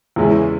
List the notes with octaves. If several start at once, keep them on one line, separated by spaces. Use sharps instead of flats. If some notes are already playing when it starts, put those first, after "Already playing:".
E2 C#3 G#3 C#4 E4